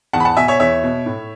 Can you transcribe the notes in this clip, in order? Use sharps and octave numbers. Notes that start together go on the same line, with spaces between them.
E2 F#5 A5
B5
F#5 A5
B2 E5 G#5
C#5 E5
E2 C#5 E5
B2
A2